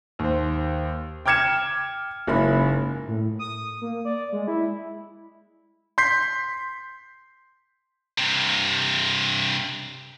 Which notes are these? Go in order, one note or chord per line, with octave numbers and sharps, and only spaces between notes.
D#2 C5
G5 D6 F6 G#6 C#7 E7
F#1 G#2 A#3 C#4 E4 B5
A2
D#6
A#3
D5
G#3
E4
C6 G6 B6 C7
G2 C3